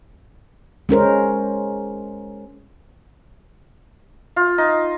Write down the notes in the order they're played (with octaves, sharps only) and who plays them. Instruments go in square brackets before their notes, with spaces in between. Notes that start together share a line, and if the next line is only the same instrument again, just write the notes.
[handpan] G#3 C#4 A#4 C5
[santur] F4
D#4